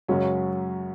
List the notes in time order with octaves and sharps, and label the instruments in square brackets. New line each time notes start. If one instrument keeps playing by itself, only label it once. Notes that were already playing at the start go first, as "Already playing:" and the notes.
[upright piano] F#2 C#3 G#3 C#4 [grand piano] F#3